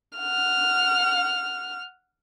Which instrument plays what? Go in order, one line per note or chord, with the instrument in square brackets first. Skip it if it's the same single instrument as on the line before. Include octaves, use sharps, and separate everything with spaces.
[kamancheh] F#5 F6